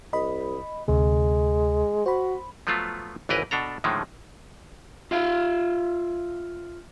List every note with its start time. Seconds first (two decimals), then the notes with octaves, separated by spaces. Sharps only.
0.13 C2 D#5 B5
0.88 D2 C3 G#3
2.06 F#4 C5 B5
2.67 F3 F#3 A3 B3 F4
3.29 G#1 C#2 E3 A#4 B4 D#5
3.51 B2 D4 A4 A#5
3.84 A2 D3 D#3 F3 G#3
5.11 F4 E5 F5